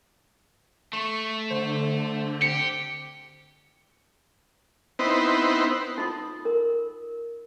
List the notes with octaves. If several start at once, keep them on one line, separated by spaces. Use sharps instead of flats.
A3 C#6
D3 C5
C4 G4 C#7
B3 C4 D#4 E4 B4 C5
D#4 F4 C6 D#6
A#4